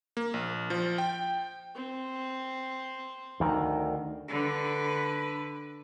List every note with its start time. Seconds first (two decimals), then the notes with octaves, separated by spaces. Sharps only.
0.17 A#3
0.34 A#1
0.70 F3
0.98 G5
1.75 C4
3.40 D2 D#3
4.29 D3 B4